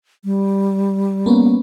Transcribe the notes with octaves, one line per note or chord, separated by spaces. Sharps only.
G3
A#3 B3 C#4